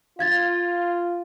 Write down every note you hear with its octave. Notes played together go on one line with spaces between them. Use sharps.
F4 F5 G#6 A6